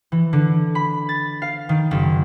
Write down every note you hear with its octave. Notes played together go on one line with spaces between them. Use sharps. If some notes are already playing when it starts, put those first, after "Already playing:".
E3
D3
B5
A6
F5
D#3
F#1